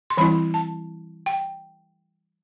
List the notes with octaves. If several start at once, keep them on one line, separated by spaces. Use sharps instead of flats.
C6
E3 G3 C4 E4 B5
A5
G5